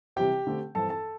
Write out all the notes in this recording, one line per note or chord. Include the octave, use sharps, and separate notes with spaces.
C3 E3 G3 C4 G4 G5
D3 A3 C4
G2 E3 C4 A4 A5
A4 A5